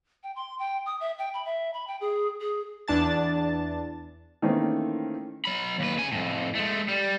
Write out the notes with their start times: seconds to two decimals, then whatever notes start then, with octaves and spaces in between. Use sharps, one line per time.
0.23 G5
0.36 C6
0.59 G5
0.86 D#6
1.00 E5
1.18 G5
1.34 B5
1.45 E5
1.74 B5
1.87 G5
2.01 G#4
2.41 G#4
2.88 E2 D4 A5 A6
4.42 D#3 E3 A3 A#3 C4 C#4
5.45 F#3 B5
5.80 D#2 B4
5.98 C#3 G#5
6.12 F2 A2
6.55 G#3 A3
6.88 G3